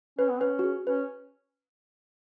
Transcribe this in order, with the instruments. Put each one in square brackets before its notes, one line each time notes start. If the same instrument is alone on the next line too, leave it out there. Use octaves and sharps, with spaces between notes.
[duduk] C#4 [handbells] B4
[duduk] B3
[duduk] C#4 [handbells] B4
[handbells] F#4
G#4
[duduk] C#4 [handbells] B4